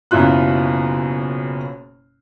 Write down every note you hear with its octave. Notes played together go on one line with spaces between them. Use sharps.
F#1 F#2 B2 E4 F4 F#6